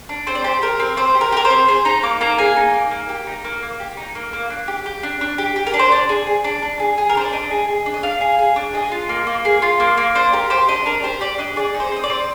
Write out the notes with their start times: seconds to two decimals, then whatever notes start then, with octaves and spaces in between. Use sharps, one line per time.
0.09 D4
0.27 C4 C5
0.35 D5
0.44 G4 C5
0.62 G4 A#4
0.80 C4
0.97 C4 C5
1.15 G4
1.21 A#4
1.32 G4 A#4
1.45 C5
1.50 C4
1.68 G#4 C5
1.85 D#4 A#5
2.03 A#3 D6
2.21 A#3 A#5
2.38 G#4 G#5
2.56 D#4
2.74 A#3
2.91 A#3
3.09 G4
3.27 D#4
3.45 A#3
3.62 A#3
3.80 G4
3.97 D#4
4.15 A#3
4.33 A#3
4.50 D4
4.68 G4
4.86 G4
5.03 D4
5.21 D4
5.38 G4
5.56 G4
5.67 A#4
5.74 D4
5.79 C5
5.92 D4 D5
6.09 G#4
6.27 G#4
6.44 D4
6.62 D4
6.80 G#4
6.98 G#4
7.09 A#4
7.15 D4 C5
7.25 D5
7.32 D4 D#5
7.51 G#4
7.68 G#4
7.86 D4
7.94 D#5
8.03 D4 F5
8.21 G#4
8.39 G#4
8.56 D4
8.74 G#4 D#5
8.92 F4
9.09 A#3
9.27 A#3
9.45 G#4
9.62 F4
9.80 A#3
9.98 A#3
10.15 D4 C5
10.33 G4 A#4
10.50 G4 C5
10.68 D4 D#5
10.86 D4 A#4
11.03 G4 C5
11.21 G4 D5
11.39 D4 D#5
11.56 G#4 D5
11.74 D#4
11.80 C5
11.92 C4 D#5
12.04 D5
12.10 C4